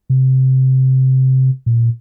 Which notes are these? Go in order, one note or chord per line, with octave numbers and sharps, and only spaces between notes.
C3
A#2